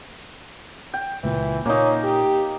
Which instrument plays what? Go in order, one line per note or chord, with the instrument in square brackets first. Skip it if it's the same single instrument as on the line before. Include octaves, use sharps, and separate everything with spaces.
[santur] G5
[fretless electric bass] C#2 A#2 [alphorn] E3
[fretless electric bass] A#2 [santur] A#3 D#4 [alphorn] C#4
[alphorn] G4